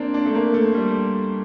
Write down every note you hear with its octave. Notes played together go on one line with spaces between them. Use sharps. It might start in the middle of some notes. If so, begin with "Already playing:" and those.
Already playing: A#3 C4 D4
D4
A3
A#3
A3
G3